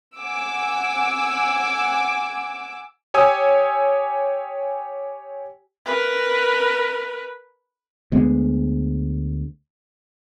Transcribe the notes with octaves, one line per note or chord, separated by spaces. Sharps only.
F#5 G#5 D6 E6
G4 C#5 G#5 D#6 E6
A#4 B4
D2 G#3 B3